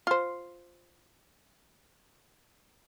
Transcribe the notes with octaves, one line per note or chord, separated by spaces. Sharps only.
F4 C5